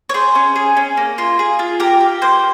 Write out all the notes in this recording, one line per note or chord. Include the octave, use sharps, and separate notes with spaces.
C#5
G#4 C5
C#4
G#4
C#4
A#3
F4
G#4
F4
G4 A#4
G4
A#3 C5